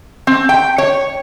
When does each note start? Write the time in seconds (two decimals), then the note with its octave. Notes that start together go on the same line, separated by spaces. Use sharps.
0.27 C4
0.49 G5
0.78 C#5